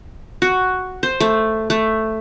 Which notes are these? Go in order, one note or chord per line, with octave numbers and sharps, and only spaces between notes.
F#4
C5
A3
A3